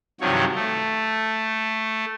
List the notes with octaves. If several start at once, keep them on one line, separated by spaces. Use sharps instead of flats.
G2 C3 D#3 F3 F#3 C#5
A3